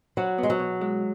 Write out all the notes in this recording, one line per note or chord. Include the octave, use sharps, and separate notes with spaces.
F#3 F#4
B3
G#3
F#3
B2
G#3